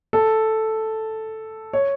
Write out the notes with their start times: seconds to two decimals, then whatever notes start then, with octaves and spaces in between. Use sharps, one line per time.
0.13 A4
1.73 C#5